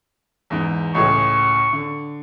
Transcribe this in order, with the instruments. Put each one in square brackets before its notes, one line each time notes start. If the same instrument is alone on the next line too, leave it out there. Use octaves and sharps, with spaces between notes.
[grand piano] E2 G#2
[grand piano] C#2 A2 G#4 [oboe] C#6
[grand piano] D3